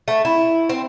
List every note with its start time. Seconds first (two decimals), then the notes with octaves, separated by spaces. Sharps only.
0.08 A3
0.25 E4
0.69 C4